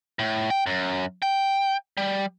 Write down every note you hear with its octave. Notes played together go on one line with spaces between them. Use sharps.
A2
G5
F#2
G5
G3